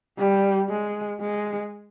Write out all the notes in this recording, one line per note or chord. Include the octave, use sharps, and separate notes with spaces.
G3
G#3
G#3